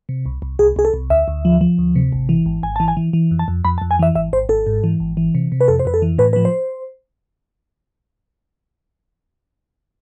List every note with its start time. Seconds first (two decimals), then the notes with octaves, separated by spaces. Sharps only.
0.09 C3
0.26 C2
0.42 C2
0.59 C2 G#4
0.76 C2 G#4
0.85 A4
0.94 C2
1.10 D2 E5
1.28 D2
1.45 F3
1.61 F3
1.78 D2
1.96 C3
2.12 G#1
2.29 E3
2.46 G#1
2.63 G#1 G#5
2.76 E3 A5
2.88 G#5
2.97 E3
3.13 E3
3.31 F2
3.39 A5
3.48 F2
3.65 F2 B5
3.78 A5
3.82 F2
3.91 G#5
3.99 E3 E5
4.15 G#1 E5
4.33 G#1 C5
4.49 G#1 A4
4.67 G#2
4.84 E3
5.00 G#1
5.17 E3
5.35 C3
5.52 C3
5.61 B4
5.68 F2 A4
5.79 C5
5.85 F2 B4
5.94 A4
6.02 E3
6.18 A2 B4
6.33 F3 B4
6.45 C5